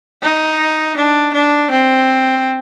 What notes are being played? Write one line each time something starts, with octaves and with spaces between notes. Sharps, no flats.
D#4
D4
D4
C4